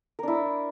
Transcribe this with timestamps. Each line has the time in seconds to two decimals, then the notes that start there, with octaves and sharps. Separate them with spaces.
0.19 A#4
0.23 D4
0.28 E4